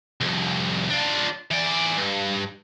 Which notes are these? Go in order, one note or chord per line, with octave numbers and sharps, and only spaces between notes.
C2 F2
D4 F4
E3 D5
G2